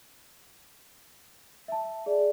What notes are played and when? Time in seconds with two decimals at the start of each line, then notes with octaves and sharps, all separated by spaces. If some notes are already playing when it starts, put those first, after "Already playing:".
1.68 E5 A5
2.06 G#4 D5